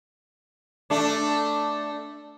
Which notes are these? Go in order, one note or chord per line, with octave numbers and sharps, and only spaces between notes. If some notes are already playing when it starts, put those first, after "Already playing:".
A3 D4